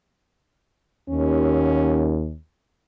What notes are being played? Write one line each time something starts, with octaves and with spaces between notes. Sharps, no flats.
D#2 C#4